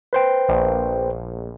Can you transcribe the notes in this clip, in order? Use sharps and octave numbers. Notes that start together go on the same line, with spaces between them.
B4 C5 G5
A#1